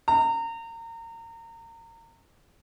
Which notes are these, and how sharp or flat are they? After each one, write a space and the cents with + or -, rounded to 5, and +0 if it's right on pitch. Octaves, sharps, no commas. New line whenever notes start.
A#5 -30